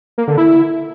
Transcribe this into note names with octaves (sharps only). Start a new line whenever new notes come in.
A#3
D3
E4